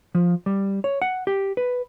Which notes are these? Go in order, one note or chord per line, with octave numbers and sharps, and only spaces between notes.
F3
G3
C#5
F#5
G4
B4